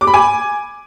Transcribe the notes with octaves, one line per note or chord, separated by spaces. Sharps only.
D6
B5
G#5